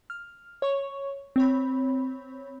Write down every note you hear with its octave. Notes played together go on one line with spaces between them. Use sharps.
F6
C#5 C#6
C4 C#5 B5